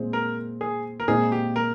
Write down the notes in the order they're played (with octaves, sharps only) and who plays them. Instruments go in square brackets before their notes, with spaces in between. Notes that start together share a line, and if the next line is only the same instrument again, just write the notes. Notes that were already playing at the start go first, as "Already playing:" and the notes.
Already playing: [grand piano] A#2 G#3 C4
[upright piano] A#4
G#4
A#4
[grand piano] A#2 G#3 C4 D#4 [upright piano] G#4
[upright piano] G4
A#4